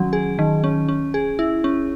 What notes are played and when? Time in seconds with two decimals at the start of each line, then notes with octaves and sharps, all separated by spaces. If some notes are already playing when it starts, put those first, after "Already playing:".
Already playing: D#3 F#3 C#4
0.13 G#4
0.39 D#3
0.64 C#4
0.88 C#4
1.14 G#4
1.39 E4
1.64 C#4